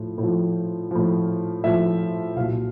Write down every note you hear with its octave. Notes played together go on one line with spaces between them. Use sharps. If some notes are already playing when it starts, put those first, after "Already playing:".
Already playing: A2 F3
A2
F3
A2 F3
A2 F3 E5
C2 A#2 F#3 F5